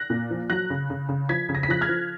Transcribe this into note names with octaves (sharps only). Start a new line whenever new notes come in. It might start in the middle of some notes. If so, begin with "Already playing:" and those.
Already playing: F#6 A#6
A#2
F3
F#3 F#6 A#6
C#3
C#3
C#3
F3 G#6 B6
C#3
A#6
B6
F3 F#6 A#6
F6 G#6
F3